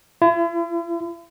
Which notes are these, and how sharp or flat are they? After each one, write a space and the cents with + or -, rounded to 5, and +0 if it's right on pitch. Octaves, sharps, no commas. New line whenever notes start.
E4 +45